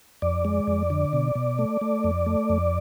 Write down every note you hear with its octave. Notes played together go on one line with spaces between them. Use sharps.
F2 D5
G#3
F2
D3
B2
B2
A3
A3
F2
A3
F2